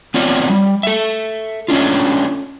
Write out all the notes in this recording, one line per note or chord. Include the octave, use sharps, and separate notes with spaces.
B3 C4 F4 C#5 D5
G3
A4 E5
A3 C#4 D4 F4